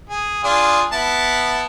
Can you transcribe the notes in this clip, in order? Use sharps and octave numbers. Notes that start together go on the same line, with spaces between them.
G#4
D4 F4 G#4
B3 E4 A5